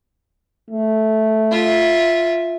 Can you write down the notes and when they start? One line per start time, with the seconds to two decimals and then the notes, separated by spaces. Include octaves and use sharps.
0.70 A3
1.51 F4 E5